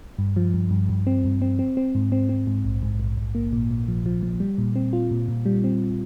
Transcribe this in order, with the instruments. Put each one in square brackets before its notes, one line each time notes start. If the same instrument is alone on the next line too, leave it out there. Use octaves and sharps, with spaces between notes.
[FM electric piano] G2
F3
G2
G2
G2
C4
G2
C4
C4
C4
G#2
C4
C4
G#2
A#1
G#2
A#1
A#1
A#3
A#2
A#2
F3
F3
F3
G3
A#2
C4
F4
A#2
A#2
G3
C4